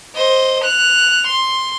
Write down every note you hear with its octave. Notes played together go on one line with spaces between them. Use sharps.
C5 D#5
F#6 F7
C6